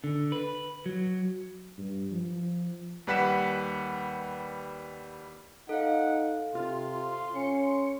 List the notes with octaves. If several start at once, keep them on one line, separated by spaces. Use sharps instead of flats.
D3
B4
F#3
G2
F3
D#2 G3 B4 F#5 B6 E7
D#4 A4 F5 F#5
C3 F4 C6
C#4 C#7